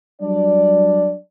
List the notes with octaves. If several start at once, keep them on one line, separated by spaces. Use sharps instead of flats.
F#3 G3 D4 D5